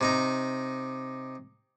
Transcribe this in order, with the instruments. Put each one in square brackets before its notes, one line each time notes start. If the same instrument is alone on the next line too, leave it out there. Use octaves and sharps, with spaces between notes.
[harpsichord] C3 D#4 A#5